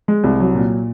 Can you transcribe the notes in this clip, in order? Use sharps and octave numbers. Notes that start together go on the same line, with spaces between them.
G#3
C2
F#3
A#2